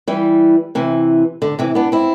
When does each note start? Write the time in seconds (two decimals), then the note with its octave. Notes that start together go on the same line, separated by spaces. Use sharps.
0.07 E3 G3
0.75 C3 E3
1.42 D3
1.59 C3 E3
1.75 B3 D4
1.92 C4 E4